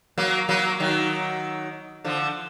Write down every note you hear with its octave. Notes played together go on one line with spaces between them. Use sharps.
F#3 A#3
F#3 A#3
D#3 F#3
D3 F3